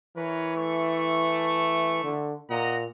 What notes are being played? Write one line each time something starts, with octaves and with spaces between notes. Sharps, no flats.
E3 A#4 B4 C#5
A3 C#6
D3
A#2 D#5 F#5 A#5